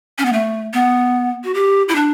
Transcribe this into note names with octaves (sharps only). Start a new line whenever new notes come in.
C#4
B3
A3
B3
F#4
G4
E4
D4